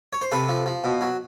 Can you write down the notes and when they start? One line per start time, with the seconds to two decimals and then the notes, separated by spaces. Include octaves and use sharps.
0.13 C#5
0.21 C5
0.32 C3 A4 B4
0.49 F3
0.66 F3
0.84 B2
1.01 F#3